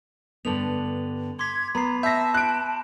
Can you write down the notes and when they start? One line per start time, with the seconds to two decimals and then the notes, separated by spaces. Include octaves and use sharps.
0.45 G2 D3 B3 F7 F#7
1.39 C6 D6 G#6 B6
1.75 B3 A#5 B5 C7
2.03 E5 A5 G6 A#6 C7
2.34 F#6 D7